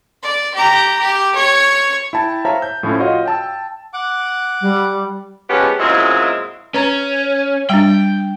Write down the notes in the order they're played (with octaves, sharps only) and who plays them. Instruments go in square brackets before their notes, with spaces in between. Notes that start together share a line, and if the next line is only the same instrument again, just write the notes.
[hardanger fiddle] D5
G4 A#5
G4
C#5 C#6
[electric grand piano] E4 G5 A5
C5 C#5 E5 F5 A5 A#5
G6
A2 F3 A3 C#4 E4
F4 F#4 C#5 D#5 F5 F#5
G5 A5 E6
[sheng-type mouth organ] F#5 D6
[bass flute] G3
[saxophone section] F3 G#3 B3 C#4 G4
F#2 A#2 G#3 C4 E4 D#5
[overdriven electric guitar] C#4 [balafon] B4 A#5
[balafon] G3 D4 [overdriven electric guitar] G5